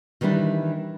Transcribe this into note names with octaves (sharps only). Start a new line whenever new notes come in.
D#3 E3 G3 D4 E4